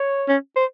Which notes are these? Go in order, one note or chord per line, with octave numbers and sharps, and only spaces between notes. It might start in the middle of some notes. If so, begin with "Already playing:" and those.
Already playing: C#5
C#4
C5